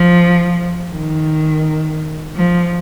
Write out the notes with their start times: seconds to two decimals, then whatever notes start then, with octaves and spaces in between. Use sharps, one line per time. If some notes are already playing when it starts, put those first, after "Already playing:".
Already playing: F3
0.92 D#3
2.36 F3